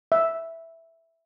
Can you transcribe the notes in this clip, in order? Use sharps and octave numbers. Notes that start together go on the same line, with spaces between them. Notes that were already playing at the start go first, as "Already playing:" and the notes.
E5